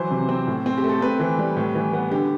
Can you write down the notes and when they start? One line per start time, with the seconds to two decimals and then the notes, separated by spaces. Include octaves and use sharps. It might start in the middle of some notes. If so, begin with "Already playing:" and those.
Already playing: E3 F#3 C5
0.11 C3
0.29 C4
0.47 A2
0.66 C4
0.78 G4
0.84 A3
0.89 A4
1.01 C4 B4
1.20 E3
1.39 G3
1.56 A2
1.75 E3
1.93 B3
2.11 D3 G4